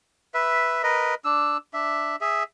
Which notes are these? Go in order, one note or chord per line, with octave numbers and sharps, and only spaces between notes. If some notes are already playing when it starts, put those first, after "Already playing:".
B4 E5
A#4 B4 D#5
D4 E6
D4 E5
G#4 E5